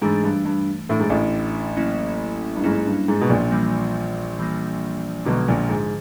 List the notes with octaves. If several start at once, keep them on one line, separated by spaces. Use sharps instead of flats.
G#2 E3 A3 D4
G2
G2
A2 E3 A3 D4
G#2
A1 A2
F#3 A#3 C#4 E4
G2
G#2 F#3 A#3 C#4 E4
G2
G#2
B2
A#1 A#2
E3 G3 A#3
E3 G3 A#3
B1 B2 D3 F3 G#3
A#1 A#2
G#2